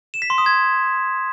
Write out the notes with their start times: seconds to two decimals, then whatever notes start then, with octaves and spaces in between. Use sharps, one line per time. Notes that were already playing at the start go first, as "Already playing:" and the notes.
0.14 E7
0.22 B6
0.30 C6
0.38 D#6
0.46 G#6